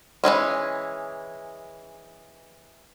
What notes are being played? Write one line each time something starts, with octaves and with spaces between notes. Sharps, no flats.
E3 F#3 G#3 C#4